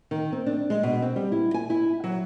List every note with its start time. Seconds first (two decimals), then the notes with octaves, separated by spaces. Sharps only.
0.11 D#3
0.32 C4
0.46 D4
0.70 G#3
0.83 B2
1.02 C4
1.16 G3
1.32 E4
1.54 G#5
1.70 E4
2.04 F#3